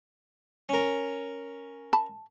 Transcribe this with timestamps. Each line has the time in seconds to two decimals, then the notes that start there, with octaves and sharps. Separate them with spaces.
0.69 C#4 A#4
1.93 A5 B5